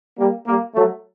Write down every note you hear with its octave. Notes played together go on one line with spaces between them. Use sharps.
G3 A#3
G3 A#3
F#3 A3